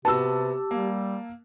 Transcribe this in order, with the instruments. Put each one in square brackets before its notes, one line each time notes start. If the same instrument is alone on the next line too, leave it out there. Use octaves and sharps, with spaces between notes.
[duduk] C3 [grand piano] B3 F#4 [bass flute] G4 [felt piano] A5 E6
[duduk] G3 [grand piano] A#3